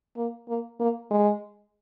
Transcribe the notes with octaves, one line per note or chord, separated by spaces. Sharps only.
A#3
A#3
A#3
G#3